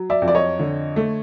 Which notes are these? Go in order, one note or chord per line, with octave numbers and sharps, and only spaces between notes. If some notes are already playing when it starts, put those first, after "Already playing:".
Already playing: F#3
D5 E5
F2
D5
C#5 D#5
D3
A3